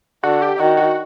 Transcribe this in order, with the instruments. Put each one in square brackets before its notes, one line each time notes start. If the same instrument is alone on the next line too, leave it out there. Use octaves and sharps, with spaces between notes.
[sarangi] D3 [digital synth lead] F#4
[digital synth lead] G4
[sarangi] D#3 [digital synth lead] F#4
[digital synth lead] F#4